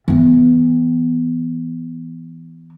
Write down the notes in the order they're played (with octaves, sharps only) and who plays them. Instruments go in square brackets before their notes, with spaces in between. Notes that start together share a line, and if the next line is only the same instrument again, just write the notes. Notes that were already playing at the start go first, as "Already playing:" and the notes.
[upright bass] E3 B3